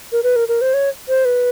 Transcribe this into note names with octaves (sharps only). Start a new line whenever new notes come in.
A#4
B4
A#4
A#4
C5
C#5
C5
B4